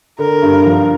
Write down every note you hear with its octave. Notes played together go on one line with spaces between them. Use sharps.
D3 A#4
G2
F3